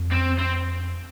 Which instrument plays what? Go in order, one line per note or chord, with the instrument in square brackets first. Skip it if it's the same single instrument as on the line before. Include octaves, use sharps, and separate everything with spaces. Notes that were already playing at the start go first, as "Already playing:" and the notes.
Already playing: [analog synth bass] F2
[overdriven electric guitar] C4
C4